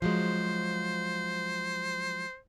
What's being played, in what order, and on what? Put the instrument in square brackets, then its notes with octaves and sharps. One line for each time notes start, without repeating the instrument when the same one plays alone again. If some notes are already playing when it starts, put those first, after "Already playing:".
[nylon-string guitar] F3 F#3 G#3 [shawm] C5